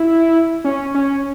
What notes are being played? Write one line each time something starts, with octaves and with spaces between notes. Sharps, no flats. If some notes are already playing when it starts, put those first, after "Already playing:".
Already playing: E4
C#4
C#4